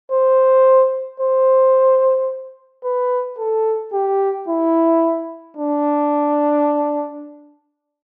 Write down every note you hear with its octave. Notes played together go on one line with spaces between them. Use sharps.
C5
C5
B4
A4
G4
E4
D4